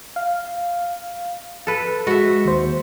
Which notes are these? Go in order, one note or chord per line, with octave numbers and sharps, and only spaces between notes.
F5
A4 B4
G#3 F#4 E5
D#2 C5